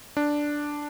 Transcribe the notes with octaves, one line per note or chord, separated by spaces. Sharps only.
D4